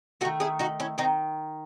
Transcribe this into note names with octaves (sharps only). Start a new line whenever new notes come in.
D#3 A3 F#4 A4
E4 G#4
D#4 F#4
C#4 E4
D#3 C4 D#4